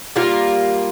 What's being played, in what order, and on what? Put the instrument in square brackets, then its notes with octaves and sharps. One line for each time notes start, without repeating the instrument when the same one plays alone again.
[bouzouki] G3 A#3 F4